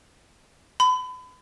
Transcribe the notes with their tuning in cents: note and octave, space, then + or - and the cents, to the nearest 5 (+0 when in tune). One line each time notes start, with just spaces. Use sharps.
B5 +35